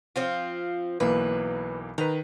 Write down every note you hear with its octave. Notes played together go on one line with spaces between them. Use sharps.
F3 C4 F4
B1 E3 A#3 B4
D#3 B4 A#5